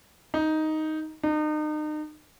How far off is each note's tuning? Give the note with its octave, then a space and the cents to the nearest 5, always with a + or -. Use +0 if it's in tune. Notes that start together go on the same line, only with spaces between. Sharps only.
D#4 +5
D#4 -35